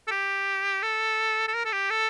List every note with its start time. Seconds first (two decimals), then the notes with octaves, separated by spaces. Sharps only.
0.07 A4
0.11 G4
0.82 A4
1.48 A4
1.54 A#4
1.65 A4
1.72 G4
1.90 A4